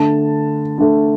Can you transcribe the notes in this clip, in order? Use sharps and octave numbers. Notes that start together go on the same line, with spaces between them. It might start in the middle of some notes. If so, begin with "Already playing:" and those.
Already playing: D3 A3 A5
D3 A3